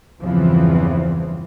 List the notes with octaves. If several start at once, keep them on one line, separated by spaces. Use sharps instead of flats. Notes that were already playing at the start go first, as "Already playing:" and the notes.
E2 G2 C#3 E3 F3 C4